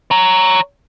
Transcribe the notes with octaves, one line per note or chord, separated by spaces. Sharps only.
C#5 A#5